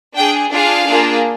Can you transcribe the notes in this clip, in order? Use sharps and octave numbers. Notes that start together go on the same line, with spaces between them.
D4 G#4 G5
D4 F4 G#4 F5
A#3 D4 F4 G#4